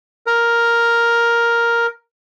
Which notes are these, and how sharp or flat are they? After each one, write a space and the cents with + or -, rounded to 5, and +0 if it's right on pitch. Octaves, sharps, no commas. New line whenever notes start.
A#4 +5